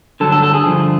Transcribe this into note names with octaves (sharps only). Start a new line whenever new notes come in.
G2 D3 F#3 A4
A4
A4
G#4
G2 D3 F3